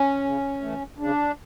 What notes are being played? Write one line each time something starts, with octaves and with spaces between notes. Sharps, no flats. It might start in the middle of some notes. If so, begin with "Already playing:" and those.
Already playing: C#4
C#3
E3 A3
C#3 D4